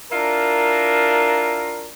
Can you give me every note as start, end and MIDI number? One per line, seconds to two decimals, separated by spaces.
0.12 1.94 62
0.12 1.94 64
0.12 1.94 65
0.12 1.94 70